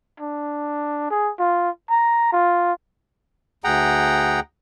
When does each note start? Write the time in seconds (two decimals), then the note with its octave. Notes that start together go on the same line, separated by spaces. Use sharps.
0.20 D4
1.11 G#4
1.39 F4
1.90 A#5
2.33 F4
3.64 D2 G#4 F#5 G5 A#5